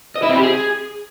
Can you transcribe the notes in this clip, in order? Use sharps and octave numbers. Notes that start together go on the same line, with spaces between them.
D#5
E4
C4
G4
G#4